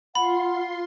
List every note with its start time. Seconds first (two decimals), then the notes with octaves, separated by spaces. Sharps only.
0.15 F4 F#5 B5 C6